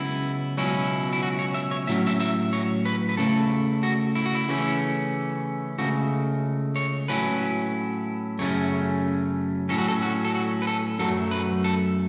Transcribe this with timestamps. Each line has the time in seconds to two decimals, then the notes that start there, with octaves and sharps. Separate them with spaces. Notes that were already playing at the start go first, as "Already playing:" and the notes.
Already playing: C#2 C#3 F#3 B3 E4
0.57 C#2 B2 F#3 C#4 E4
1.13 E4
1.23 F#4
1.39 C#5
1.54 E5
1.71 C#5
1.87 A2 F#3 C#4 E5
2.07 E5
2.20 E5
2.53 C#5
2.85 B4
3.09 B4
3.17 C#3 A3 E4 A4
3.83 F#4
4.15 E4
4.25 F#4
4.35 E4
4.49 C#3 E3 A3 C#4
5.79 C#2 C#3 A3 F#4
6.76 C#5
7.08 A2 F#3 C#4 E4 B4
8.39 F#2 C#3 A3 C#4 C#5
9.69 A2 F#3 C#4 A4
9.78 F#4
9.88 A4
10.02 F#4
10.25 A4
10.34 F#4
10.62 B4
10.67 A4
10.99 F#2 F#3 A3 A4
11.31 B4
11.64 A4